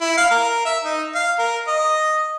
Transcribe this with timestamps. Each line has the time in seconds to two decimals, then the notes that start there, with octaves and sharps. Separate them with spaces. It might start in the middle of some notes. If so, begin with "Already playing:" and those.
0.01 E4
0.18 F5
0.31 A#4
0.65 E5
0.84 D#4
1.15 F5
1.38 A#4
1.68 D#5